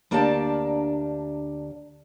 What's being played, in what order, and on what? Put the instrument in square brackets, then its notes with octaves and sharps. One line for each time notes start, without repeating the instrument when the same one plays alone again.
[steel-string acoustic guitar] D2 A#3 D4 G4 D5 A5